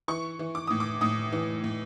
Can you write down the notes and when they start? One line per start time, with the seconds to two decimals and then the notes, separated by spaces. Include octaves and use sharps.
0.08 E3 C#6
0.39 E3
0.55 D6
0.67 A2 D#6
0.80 D6
1.01 A2 D#6
1.32 E3
1.64 A2